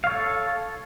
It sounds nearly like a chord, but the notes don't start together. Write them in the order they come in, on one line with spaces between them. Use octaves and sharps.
F5 C#5 A4